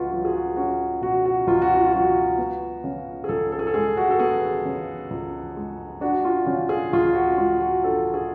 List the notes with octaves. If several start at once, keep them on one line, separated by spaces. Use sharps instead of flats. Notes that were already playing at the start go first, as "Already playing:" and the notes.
Already playing: C#2 F4 F#4 B4
F#3 F4
G#4
F#4
C#4 F#4
B2 F#4
F#4
C#2 F4
F#4
F4
F4
F#3 F#4
B3
C#3
G#4
C#2 A4
A4
G#4
A4
G#3 G#4
F#4
A4
B3 G#4
C#3
C#2
G#3
D4 F#4
F4
C#3
G#4
C#2 F4
F#4
G#3 F4
F#4
D4 A4
G#4